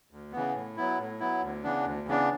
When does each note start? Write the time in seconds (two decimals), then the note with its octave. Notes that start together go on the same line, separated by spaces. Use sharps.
0.11 D2
0.32 C#3 E3 B3
0.55 A2
0.77 F#3 B3 E4
0.98 A2
1.20 F#3 B3 E4
1.42 D2
1.63 C#3 E3 B3 D4
1.85 D2
2.07 C#3 E3 B3 D4